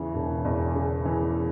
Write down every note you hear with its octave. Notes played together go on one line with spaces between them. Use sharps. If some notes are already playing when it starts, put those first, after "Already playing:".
Already playing: E2 C#3 E3
E1
E2
C#3
E3